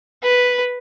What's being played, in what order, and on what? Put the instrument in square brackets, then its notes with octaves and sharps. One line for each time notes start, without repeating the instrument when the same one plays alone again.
[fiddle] B4